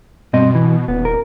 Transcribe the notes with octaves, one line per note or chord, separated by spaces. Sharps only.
G2 B2 C4 D#5
E3
D#1 B3
A#4